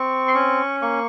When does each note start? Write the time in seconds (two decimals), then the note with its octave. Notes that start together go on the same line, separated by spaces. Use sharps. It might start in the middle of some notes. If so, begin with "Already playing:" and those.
Already playing: C4 C#6
0.28 C6
0.34 C#4 C#6
0.82 A#3 C#6